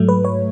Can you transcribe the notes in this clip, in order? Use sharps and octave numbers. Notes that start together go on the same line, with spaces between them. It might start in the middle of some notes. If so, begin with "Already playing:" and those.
Already playing: G#2 F#3 A3
B4
C#5